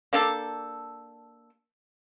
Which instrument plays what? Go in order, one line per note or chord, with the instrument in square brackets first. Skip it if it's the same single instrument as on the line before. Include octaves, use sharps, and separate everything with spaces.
[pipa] A#3 D4 G4 A4